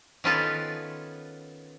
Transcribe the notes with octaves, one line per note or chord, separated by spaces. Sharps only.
D#3 B3 C#4 F4 A4 B4